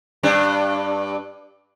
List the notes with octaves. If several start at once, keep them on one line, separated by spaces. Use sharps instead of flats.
G2 D4